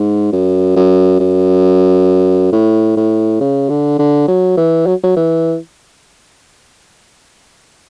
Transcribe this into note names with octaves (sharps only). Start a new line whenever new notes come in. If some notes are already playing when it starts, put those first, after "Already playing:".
Already playing: G#2
F#2
F#2
F#2
A2
A2
C#3
D3
D3
F#3
E3
F#3
F#3
E3